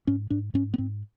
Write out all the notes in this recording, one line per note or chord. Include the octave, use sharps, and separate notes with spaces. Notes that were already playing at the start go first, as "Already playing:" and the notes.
G#2 C#4
G#2 D4
G#2 C#4
B3
G#2 C4